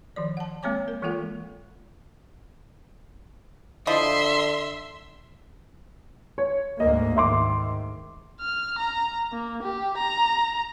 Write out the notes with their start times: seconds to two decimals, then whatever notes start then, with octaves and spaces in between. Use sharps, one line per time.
0.16 D#3 F3 D5
0.37 F#5 A5
0.63 G#3 A#3 C4 C#5 G#5 D6
0.88 A#4
1.02 E3 G#3 A#3 F4 A4 F#5
3.87 D3 F3 E4 D#5 E5 C6
6.38 C#5
6.80 D2 G#2 A#3 D#5
7.16 G#2 D#3 E5 C6 D6
8.40 F6
8.78 A#5
9.32 A#3
9.62 G4
9.97 A#5